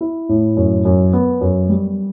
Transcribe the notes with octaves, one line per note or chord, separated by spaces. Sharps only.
E4
A2
F#2
F#2
B3
F#2
G3